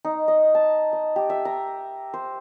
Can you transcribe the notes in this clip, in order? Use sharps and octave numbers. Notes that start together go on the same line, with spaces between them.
D#4
D#5
A5
D#5
G4
E5
A#5
C5